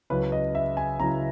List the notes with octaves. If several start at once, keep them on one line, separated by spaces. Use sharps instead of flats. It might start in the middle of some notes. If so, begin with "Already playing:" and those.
C#2 C#3 F#3 C#4 E4 B4
D#5
E5
G#5
C#2 C#3 F#3 C#4 E4 A#5